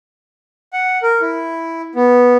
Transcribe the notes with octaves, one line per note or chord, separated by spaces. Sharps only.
F#5
A#4
E4
B3